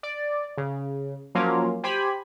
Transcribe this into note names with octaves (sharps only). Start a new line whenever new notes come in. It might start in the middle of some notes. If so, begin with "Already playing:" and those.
D5
C#3
F3 F#3 A#3 C#4 F4
G4 C5 G#5 B5